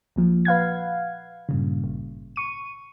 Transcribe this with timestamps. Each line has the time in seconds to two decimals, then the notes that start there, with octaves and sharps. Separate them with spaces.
0.16 A#1 A#2 F3
0.45 B4 F5 F#5 G#6
1.49 G2 A#2 C#3
1.84 G#1
2.36 C#6 D#7